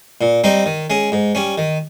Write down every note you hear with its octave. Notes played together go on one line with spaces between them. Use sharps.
A#2
G3 C4 D#4
D#3
G#3 C#4
G#2
G3 C#4
D#3